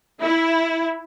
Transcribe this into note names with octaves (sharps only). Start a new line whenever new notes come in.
E4